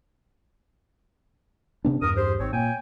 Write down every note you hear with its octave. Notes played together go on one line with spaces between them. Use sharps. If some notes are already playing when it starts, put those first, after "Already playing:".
C3 B3 D4
E2 G2 A#4 D#6
G4 G#4 C5
G#1 C4 C#5
A#2 C#5 G5 G#5